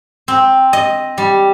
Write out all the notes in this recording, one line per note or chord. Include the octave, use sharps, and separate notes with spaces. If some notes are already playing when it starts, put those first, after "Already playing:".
C4
D#5
G3